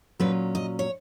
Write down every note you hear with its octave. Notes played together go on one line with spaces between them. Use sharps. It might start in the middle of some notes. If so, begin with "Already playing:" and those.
A#2 F#3 C#4 B4
D#5
C#5